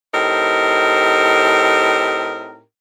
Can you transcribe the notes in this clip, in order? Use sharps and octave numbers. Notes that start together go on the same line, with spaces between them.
A2 C4 D#4 G4 A#4